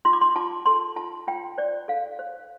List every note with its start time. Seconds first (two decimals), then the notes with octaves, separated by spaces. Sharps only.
0.05 F4 C6
0.13 D6
0.21 C6
0.36 F4 A5
0.66 A4 C6
0.96 F4 A5
1.27 F4 G5
1.58 C5 D5
1.88 A4 F5
2.19 C5